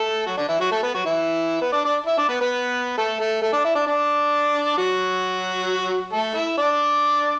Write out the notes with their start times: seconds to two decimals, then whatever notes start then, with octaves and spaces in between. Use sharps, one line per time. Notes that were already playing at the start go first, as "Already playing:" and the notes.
Already playing: A3 A4
0.26 F#3 F#4
0.37 D3 D4
0.49 E3 E4
0.60 F#3 F#4
0.71 A3 A4
0.83 B3 B4
0.94 F#3 F#4
1.05 E3 E4
1.61 B3 B4
1.72 D4 D5
1.85 D4 D5
2.06 E4 E5
2.17 D4 D5
2.29 B3 B4
2.41 B3 B4
2.97 A3 A4
3.20 A3 A4
3.42 A3 A4
3.53 D4 D5
3.65 E4 E5
3.75 D4 D5
3.87 D4 D5
4.78 F#3 F#4
6.13 A3 A4
6.34 E4 E5
6.58 D4 D5